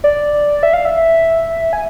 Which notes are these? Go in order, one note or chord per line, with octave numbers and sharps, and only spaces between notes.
D5
E5
F5
E5
G#5